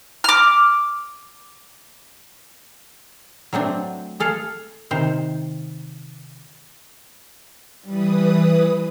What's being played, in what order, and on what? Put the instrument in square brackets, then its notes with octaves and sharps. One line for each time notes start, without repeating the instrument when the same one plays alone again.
[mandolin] D6 F6
[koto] F#3 A3 C4 D4
G#4 A4 F5
C3 D#3 C5
[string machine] E3 B4 D#6 [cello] G3